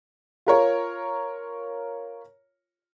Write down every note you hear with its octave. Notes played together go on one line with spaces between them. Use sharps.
F4 A#4 C#5